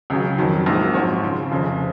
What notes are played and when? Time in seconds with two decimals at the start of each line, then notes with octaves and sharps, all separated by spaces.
0.10 C#2 C#3 F#3
0.38 F2 D#3 F#3
0.66 A#1 A#2 G#3 C4 F#4
0.95 G#2 F3 C4 F#4 C#5
1.23 C#3 F3 C4 F4
1.51 F1 F2 C#3